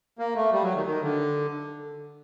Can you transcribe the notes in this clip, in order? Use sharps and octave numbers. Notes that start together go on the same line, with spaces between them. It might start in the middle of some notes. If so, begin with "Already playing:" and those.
A#3
A3
G3
F#3
D#3
D#3
D3